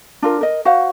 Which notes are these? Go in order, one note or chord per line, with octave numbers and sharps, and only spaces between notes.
D4 F4 A#4
A#4 D#5
F#4 C5 F5 F#5